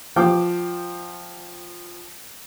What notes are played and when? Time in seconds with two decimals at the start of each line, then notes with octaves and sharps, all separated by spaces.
0.16 F3 G5 D6